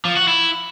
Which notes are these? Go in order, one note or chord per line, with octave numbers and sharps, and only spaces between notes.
F3
F#4
E4